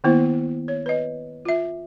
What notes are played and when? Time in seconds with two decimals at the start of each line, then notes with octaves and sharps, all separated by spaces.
0.04 D#3 A#3 B3 E4 C5
0.68 C#5
0.86 B4 D#5
1.45 F4 E5